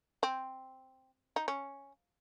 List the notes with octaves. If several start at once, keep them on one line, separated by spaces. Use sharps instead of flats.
C4
D#4
C#4